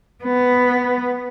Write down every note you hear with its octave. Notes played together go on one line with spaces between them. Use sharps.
B3